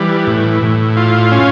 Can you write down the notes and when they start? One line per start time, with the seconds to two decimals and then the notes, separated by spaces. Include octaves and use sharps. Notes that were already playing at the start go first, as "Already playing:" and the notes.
Already playing: E3 G3
0.27 A2
0.63 A2
0.97 F4
1.31 C#4